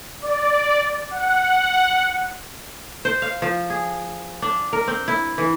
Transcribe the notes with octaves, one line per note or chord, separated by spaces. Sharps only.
D5
F#5
C5
F5
F3
G#4
D4
A#4
C4
E4
E3